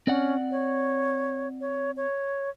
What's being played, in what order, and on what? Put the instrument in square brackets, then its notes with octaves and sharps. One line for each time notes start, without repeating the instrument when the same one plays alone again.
[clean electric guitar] C4 D5 F#5 [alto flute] C#4
[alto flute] C#5
C#5
C#5